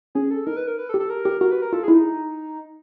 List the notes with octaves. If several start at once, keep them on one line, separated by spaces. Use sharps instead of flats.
C#4 G#4
A4
D#4 A#4
B4
A#4
B4
A4
G4
A4
A#4
G4
F#4 A#4
B4
A#4
F4 A4
G#4
E4
D#4